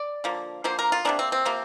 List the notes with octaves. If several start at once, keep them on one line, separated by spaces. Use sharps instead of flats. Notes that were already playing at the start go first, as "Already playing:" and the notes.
Already playing: D5
D3 F3 A#3
D3 F3 A#3 C5
A#4
F4
C3 F3 A#3 D4
C4
C4
C3 F3 A#3